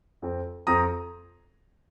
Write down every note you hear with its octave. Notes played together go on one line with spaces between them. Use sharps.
F2 F3 C4
F2 F3 C4 A#5 D#6